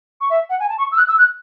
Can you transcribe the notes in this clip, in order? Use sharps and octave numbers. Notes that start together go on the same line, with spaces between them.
C#6
E5
F#5
G#5
A5
C#6
E6
F#6
E6
F#6